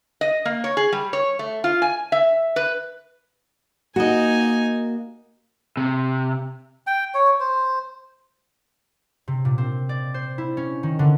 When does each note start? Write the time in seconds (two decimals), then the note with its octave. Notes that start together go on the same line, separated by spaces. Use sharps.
0.21 D#5
0.45 A#3
0.64 C#5
0.77 G#4
0.92 G3
1.13 C#5
1.39 A3
1.64 F4
1.82 G#5
2.12 E5
2.56 B4
3.96 A#3 D#4 F#4 D#5 G#5
5.77 C3
6.87 G5
7.14 C#5
7.40 C5
9.28 C3
9.45 A#2
9.58 C4
9.89 D5
10.14 C5
10.38 E4
10.57 C#4
10.83 D#3
10.99 D3